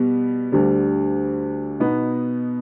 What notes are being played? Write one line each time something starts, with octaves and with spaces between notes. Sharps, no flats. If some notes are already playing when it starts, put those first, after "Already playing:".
Already playing: B2 G3 B3
D2 D3 G3
B2 B3 D#4